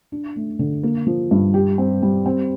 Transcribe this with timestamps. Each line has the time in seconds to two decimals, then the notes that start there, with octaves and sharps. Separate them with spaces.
0.12 D4
0.36 A3
0.59 D3
0.83 A#3
1.07 F3
1.31 G2
1.54 G4
1.78 C4
2.03 G3
2.26 C4